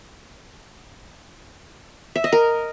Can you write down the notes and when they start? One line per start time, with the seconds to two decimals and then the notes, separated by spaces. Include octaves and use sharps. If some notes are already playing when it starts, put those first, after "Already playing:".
2.16 E5
2.24 D#5
2.33 A#4